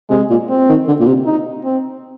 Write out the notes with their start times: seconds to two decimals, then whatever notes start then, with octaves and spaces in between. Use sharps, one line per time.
0.10 C3 G#3
0.30 A#2
0.49 C4
0.69 D#3
0.88 D3
1.00 A#2
1.07 C3
1.26 D#4
1.64 C4